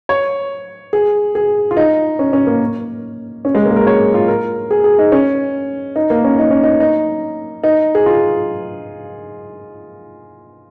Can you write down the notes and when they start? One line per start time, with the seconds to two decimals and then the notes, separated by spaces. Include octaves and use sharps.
0.09 C#5
0.93 G#4
1.35 G#4
1.71 F4
1.77 D#4
2.19 C#4
2.33 C#4
2.47 A#3
3.45 C#4
3.55 G#3
3.65 A#3
3.71 G#4
3.76 A#4
3.87 C#5
4.14 F4
4.28 A#4
4.71 G#4
4.84 G#4
4.99 D#4
5.12 C#4
5.96 D#4
6.10 A#3
6.24 C#4
6.39 D#4
6.51 C#4
6.63 D#4
6.80 D#4
7.63 D#4
7.95 G#4
8.06 F4